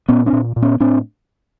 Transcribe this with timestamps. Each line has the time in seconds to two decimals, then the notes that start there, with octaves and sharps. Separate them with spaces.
0.08 A#2 B3 C#4
0.26 C4 D4
0.33 A#2
0.56 A#2
0.62 B3 C#4
0.80 A2 C4 D4